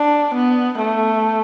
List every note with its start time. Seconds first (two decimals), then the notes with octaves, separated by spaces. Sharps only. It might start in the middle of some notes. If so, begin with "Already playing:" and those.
Already playing: D4
0.34 B3
0.81 A3